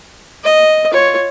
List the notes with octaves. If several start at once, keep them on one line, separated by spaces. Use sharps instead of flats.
D#5
F4 C#5